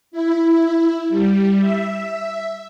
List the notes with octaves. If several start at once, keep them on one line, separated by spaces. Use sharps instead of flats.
E4
G3
E5